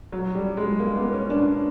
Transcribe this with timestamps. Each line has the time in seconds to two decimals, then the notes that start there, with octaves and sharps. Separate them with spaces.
0.12 F#3
0.35 G3
0.57 G#3
0.80 A#3
0.96 B3
1.13 C#4
1.30 D4